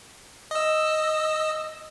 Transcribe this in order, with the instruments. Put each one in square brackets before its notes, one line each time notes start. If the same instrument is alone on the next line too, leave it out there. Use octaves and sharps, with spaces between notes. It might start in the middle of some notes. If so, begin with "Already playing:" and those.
[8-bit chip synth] D#5 E6